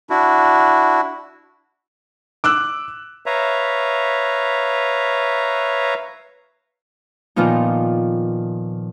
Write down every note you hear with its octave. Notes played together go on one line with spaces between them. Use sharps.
D4 E4 F#4
D6 E6 F#6
B4 C#5 E5 F5 A#5
A#2 D#3 F3 B3 D#4